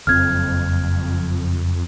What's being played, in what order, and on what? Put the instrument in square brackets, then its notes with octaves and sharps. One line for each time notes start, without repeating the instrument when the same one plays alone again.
[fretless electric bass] F#1 C4 [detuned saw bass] F2 [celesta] F6 G#6